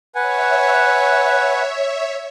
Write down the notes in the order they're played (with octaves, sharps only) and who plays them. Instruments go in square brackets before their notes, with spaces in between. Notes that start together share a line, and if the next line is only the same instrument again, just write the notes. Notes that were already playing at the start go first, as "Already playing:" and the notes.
[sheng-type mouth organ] B4 F#5 G#5 [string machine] C#5 E5